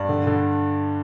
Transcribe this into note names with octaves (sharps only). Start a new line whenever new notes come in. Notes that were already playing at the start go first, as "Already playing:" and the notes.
Already playing: G2 D5
D3
D3